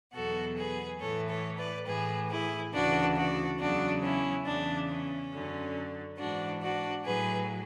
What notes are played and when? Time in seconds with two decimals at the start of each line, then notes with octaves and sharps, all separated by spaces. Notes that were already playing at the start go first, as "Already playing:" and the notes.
0.13 E2 B2 F#3 F#4 A4
0.56 G#4 B4
1.00 A2 E3 A4 C#5
1.28 A4 C#5
1.57 B4 D5
1.86 A2 E3 G#4 B4
2.29 E4 G#4
2.72 D2 C#3 E3 D4 F#4
3.15 D4 F#4
3.58 E2 C#3 F#3 D4 F#4
4.02 C#4 E4
4.45 E2 C#3 E3 D4
4.88 C#4
5.32 F#2 D3 F#3
6.17 G#2 E3 D4 F#4
6.61 D4 F#4
7.04 A2 F#3 G#4 B4